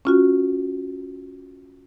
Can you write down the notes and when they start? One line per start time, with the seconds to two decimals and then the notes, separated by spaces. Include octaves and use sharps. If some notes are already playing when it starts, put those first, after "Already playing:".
0.05 C#4 F4 F#4